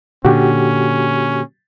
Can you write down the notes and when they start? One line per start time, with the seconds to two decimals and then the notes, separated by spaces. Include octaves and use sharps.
0.25 A#2 D3 C#4 F#4 G4